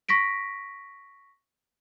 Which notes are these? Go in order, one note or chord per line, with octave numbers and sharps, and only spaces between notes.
C#6 A#6 B6 D7